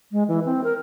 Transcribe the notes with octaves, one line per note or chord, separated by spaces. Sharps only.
G#3
E3
C4
A#4